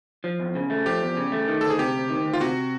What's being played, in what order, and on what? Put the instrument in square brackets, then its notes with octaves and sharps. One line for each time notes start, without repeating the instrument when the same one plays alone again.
[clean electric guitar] F3
E2
C#3
A3
[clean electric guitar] F3 [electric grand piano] G4
[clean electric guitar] E2
C#3
A3
D#3
[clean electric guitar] D2 [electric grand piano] A4
[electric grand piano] G#4
[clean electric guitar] C3 [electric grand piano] G4
[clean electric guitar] D2
D#3
D2
[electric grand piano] F4
[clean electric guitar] C3 [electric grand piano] F#4